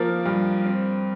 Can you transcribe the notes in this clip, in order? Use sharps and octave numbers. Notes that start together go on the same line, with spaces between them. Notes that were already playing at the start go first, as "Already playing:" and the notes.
Already playing: F3 A#3 A#4
G2
C4